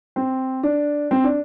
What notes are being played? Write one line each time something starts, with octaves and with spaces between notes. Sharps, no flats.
C4
D4
C4
D4